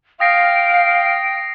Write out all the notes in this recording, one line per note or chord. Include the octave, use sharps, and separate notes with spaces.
F5 G5 D#6 A#6 C7